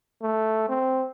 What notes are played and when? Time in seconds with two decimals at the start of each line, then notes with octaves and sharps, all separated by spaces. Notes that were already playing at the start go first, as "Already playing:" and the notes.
0.22 A3
0.69 C4